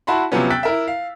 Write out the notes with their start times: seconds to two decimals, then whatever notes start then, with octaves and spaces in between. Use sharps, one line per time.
0.07 E4 F#4 A5 B5 C6
0.32 C3 F3 F#3 B3 C#4
0.50 G5 E6 F#6 A6 B6
0.63 E4 A#4 E5
0.87 F5